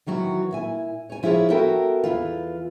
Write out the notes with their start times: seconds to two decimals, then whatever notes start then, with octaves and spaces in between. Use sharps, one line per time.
0.06 D#3 E3 F#3 F#4
0.51 A#2 E4 G#5
1.10 C#5 G#5
1.23 F3 E4 F4 G#4 C5 C#5
1.50 B3 F#4 A4 A#4 E5 G5
2.04 E2 G#2 E3 F4